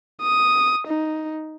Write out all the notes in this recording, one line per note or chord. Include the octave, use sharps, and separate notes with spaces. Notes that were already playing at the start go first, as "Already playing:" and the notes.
D#6
D#4